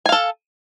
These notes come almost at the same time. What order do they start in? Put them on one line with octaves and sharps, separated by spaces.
G#5 F5 A4